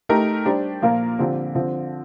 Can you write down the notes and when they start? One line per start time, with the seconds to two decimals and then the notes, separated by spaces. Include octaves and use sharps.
0.09 A3 D#4 G4 A#4
0.45 G3 D4 G4 C5
0.82 A#2 F3 A#3 F4 A#4
1.19 D3 F3 C4 G4
1.55 D3 F3 C4